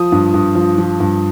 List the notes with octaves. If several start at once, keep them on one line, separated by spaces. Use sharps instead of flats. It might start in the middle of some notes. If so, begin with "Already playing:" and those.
Already playing: F3 D#6
G2
G2
F3
F3
G2